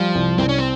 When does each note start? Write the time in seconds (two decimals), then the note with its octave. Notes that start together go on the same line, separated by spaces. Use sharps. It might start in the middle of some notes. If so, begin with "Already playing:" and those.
Already playing: F3 G3
0.15 C2
0.38 C2 C4
0.49 C#4
0.59 C4